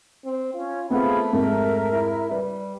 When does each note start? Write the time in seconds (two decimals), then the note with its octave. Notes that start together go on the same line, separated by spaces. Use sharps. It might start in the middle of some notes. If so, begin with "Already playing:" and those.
0.25 C4
0.54 C#4 F4
0.90 A3 B3 C4 F4 G#4 F#5 B5
1.33 F2 G#2 A#4 E5
1.93 E4
2.31 G3 B4